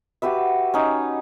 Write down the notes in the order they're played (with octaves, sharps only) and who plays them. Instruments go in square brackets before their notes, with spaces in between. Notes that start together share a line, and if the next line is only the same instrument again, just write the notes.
[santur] F#4 G4 B4 E5
C#4 D#4